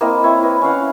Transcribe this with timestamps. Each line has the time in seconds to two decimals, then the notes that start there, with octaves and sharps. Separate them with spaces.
0.01 A#3 C4 E4 D#5
0.24 C4 E4 C#5
0.43 B4 D#5
0.62 C#4 E4 F5 F#5